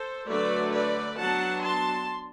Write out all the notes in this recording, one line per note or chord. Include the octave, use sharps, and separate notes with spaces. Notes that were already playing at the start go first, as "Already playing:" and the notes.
Already playing: A4 C5
D3 F#3 A3 B4 D5
B4 D5
F#3 B3 D4 F#5 A5
A5 C6